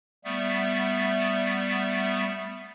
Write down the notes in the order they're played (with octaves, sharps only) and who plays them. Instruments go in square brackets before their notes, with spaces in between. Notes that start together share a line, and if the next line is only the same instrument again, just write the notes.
[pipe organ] G3 A3 B3 E5